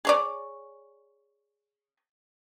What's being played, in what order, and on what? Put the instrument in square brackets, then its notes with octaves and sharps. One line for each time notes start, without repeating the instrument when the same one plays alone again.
[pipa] G#4 C#5 D5